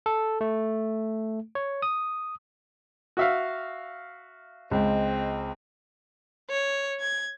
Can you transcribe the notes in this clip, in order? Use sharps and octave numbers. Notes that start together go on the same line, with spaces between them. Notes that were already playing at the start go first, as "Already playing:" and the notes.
A4
A3
C#5
D#6
F#4 E5 F5
C#2 C4 D#5
C#5
G#6